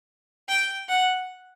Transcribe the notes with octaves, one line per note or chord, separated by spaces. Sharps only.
G5
F#5